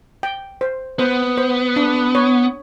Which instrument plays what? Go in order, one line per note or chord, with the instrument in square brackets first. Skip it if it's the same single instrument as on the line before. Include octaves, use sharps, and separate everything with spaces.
[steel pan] G5
C5
[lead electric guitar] B3 [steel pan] C5
[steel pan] C5
D4
C#5